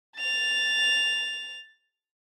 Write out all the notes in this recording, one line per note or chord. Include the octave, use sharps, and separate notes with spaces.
A6 F7